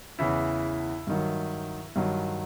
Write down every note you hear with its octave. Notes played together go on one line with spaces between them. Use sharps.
E2 C#3 E3 E4
G2 D#3 F#3
G2 D#3 F#3